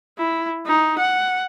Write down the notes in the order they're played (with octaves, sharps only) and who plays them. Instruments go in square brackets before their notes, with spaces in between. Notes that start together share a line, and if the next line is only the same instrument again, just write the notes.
[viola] E4
D#4
F#5